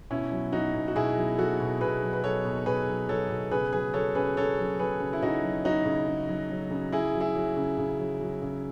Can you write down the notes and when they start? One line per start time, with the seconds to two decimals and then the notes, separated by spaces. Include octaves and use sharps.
0.10 B2 C#4 E4
0.32 F#3
0.53 F#3 D#4 F#4
0.75 B2
0.88 F#4
0.95 B2 E4 G#4
1.17 F#3
1.38 F#3 F#4 A4
1.60 B2
1.81 B2 G#4 B4
2.02 F#3
2.13 B4
2.23 F#3 A4 C#5
2.45 B2
2.66 B2 G#4 B4
2.88 F#3
3.09 F#3 A4 C#5
3.30 B2
3.51 C#3 G#4 B4
3.73 F#3 G#4 B4
3.94 F#3 A4 C#5
4.15 C#3 G#4 B4
4.37 C#3 A4 C#5
4.58 F#3
4.79 F#3 G#4 B4
5.00 C#3
5.13 E4
5.22 C#3 D#4 F#4
5.43 F#3
5.65 F#3 D#4 F#4
5.85 C#3
6.07 C#3
6.29 F#3
6.50 F#3
6.71 C#3
6.92 C#3 E4 G#4
7.14 F#3
7.21 E4 G#4
7.35 F#3
7.57 C#3
7.78 C#3
7.99 F#3
8.21 F#3
8.42 C#3